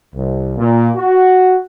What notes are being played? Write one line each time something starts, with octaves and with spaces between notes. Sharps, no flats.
C2
A#2
F#4